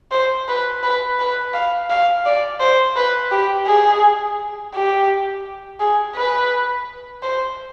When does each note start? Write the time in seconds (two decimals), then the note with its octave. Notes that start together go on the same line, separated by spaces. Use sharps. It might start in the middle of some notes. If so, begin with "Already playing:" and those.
0.11 C5
0.48 B4
0.83 B4
1.19 B4
1.53 F5
1.90 F5
2.26 D5
2.60 C5
2.96 B4
3.31 G4
3.67 G#4
4.74 G4
5.80 G#4
6.15 B4
7.23 C5